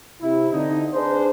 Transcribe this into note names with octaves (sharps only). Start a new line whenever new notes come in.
C3 E4
D3 C4 D#4
D4 G#4 B4 C5